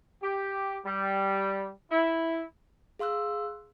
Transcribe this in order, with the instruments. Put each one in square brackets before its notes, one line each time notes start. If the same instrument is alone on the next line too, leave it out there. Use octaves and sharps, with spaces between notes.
[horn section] G4
G3
E4
[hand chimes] G#4 F5 C6 E6 F#6